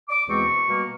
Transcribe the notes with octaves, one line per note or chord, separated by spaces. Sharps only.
D6
E2 B2 G#3 C4 C#6
B2 G3 A#3